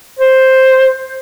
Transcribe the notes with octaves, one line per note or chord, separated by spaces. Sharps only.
C5